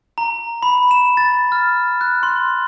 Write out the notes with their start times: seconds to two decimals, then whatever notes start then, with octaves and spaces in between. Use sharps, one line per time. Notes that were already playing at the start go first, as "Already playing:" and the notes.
0.18 A#5
0.63 B5
0.91 E7
1.17 A6
1.52 F6
2.01 F#6
2.23 C6